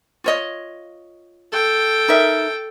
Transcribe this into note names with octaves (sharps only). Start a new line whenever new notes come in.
F4 C#5 D#5
A4 G5
D#4 A#4 E5